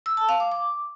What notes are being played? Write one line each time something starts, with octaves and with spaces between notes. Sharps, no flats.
E6
A5
F5
D6
D6